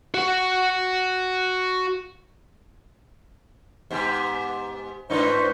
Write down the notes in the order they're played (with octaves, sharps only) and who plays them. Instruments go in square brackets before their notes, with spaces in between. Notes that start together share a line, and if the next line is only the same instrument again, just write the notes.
[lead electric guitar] F#4 F#5
[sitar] G#2 B3 G4
[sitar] G#2 D4 D#4 [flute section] B4 C5 C#6